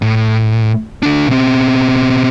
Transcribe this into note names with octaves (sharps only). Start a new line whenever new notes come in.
A2
D2 D4
B2 C4